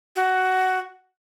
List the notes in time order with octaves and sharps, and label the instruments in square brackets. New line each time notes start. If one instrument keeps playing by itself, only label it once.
[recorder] F#4